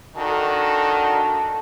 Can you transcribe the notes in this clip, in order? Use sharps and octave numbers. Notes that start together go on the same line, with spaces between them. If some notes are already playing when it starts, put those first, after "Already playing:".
D#3 D4 F#4 A4